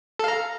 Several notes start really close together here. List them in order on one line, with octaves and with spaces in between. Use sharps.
A4 F5 A#5